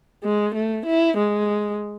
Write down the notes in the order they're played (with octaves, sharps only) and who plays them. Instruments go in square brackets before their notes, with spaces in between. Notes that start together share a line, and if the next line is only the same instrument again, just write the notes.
[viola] G#3
A3
E4
G#3